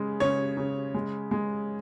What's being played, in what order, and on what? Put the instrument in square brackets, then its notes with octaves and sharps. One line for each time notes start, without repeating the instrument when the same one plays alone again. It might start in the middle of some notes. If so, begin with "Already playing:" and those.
Already playing: [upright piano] C#3 G#3
C#3 C#5
C#3
G#3
G#3